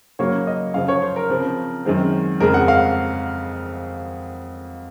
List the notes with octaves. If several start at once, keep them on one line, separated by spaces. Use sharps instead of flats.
C#3 F#3 A#3 C#5
D#5
F#2 C#3 F3 F5
C#5
C5
A#4
C#3 F3 C4
F#2 D#3 G#3 C4
F2 C#3 G#3 A#4
F#5
F5